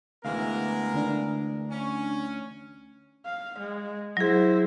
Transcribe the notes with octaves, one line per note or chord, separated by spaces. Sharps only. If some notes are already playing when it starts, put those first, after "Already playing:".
D2 E3 G#3 B3 A#4 F5
D3 D4
C#4
F5
G#3
F#3 E4 G#4 C5